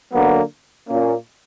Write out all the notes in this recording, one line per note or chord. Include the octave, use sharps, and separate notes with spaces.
D3 F#3 A#3 B3
A#2 A#3 C#4